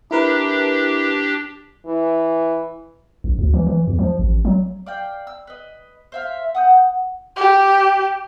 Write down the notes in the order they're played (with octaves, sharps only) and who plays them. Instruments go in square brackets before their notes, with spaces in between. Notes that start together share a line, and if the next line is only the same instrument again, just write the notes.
[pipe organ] D4 G4 [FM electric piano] E4 A#4 B4
[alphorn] E3
[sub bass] A#1
D2
E3
E3
E2
F3
A1
F#3
[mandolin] D5 F5 G5
E6
B4 D#5
C5 E5 F5
F#5 D#6 G6
[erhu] G4